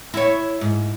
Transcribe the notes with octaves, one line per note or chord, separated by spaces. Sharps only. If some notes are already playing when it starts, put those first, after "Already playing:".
E4 C#5
G#2